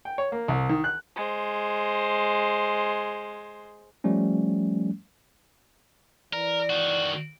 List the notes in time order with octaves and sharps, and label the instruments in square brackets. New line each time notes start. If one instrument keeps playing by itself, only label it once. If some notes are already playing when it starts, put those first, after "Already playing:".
[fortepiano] G5
C#5
A#3
C2
D#3
F#6
[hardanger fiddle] G#3 C5
[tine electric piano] F3 G3 A3 C#4
[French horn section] E3 D5 [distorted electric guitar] A#4
[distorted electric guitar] D#3 F#4